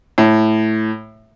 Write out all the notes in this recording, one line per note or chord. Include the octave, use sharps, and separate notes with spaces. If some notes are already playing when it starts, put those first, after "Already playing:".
A2